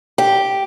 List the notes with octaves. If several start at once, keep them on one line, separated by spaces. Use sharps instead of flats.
G4